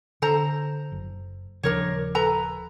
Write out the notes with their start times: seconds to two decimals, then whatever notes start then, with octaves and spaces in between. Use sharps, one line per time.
0.22 D3 A4 C5 A#5
0.92 F#1
1.63 D#1 C#3 F3 D4 A#4 C#5
2.15 A4 B4 A#5